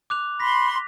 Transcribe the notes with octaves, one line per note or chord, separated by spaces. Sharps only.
D6 F#6 F7
B5 C6 A#6 B6